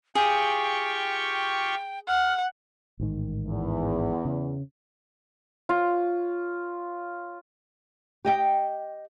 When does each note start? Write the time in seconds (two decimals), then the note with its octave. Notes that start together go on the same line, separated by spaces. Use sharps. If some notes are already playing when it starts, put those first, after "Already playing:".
0.15 F4 G4 G#4 G5 C#6
2.08 F#5 F6
3.00 A1 G#2 D#3
3.48 E2
4.25 C#3
5.69 F4 C#5
8.25 G4 D#5 G5